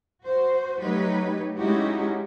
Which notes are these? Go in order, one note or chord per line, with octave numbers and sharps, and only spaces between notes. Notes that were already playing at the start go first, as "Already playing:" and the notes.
F#4 C5
F#3 A3 D#4 G4 B4 C#5
G#3 C#4 D#4 E4 F#4 G4